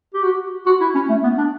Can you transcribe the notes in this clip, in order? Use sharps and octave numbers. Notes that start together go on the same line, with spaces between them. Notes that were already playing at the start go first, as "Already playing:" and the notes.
G4
F#4
F#4
E4
C#4
A3
B3
D4